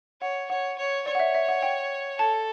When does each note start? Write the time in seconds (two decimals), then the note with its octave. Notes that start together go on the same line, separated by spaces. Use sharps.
0.21 C#5 F#5
0.49 C#5 F#5
0.78 C#5
1.06 C#5 D5
1.15 F#5
1.20 E5
1.35 E5
1.49 F#5
1.62 G5
2.18 A4 A5